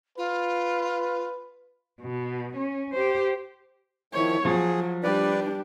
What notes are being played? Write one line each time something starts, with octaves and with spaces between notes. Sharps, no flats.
F4 B4
B2
C#4
G4 C5
D#3 F3 E4 C#5
F3 F#3 G#4
G3 D4 B4 D5